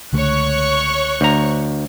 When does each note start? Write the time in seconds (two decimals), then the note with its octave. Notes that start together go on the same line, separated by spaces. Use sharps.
0.13 C#2 D3 A3 C#5 C#6 F#6
1.21 D2 A#5